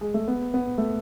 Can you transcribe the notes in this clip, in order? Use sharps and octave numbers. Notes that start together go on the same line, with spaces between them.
G#3
A3
B3
B3
A3